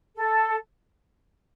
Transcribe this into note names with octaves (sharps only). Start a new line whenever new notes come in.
A4